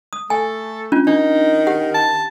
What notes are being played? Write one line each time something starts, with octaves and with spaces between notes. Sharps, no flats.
D#6
A3 A4 G#5
C#4 D4 F4
D#3 D4 D#4
G4 F#5
A5